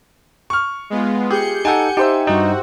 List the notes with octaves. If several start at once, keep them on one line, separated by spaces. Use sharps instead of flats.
C#6 F6
G#3 B3 F4
G4 G#4 G6 C#7
D#4 A4 F#5 G#5
D#4 G4 C5 E5
G2 D#4 F#4